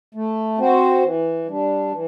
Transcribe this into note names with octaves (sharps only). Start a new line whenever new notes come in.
A3
C4 F#4 C5
E3
G3 D4
E3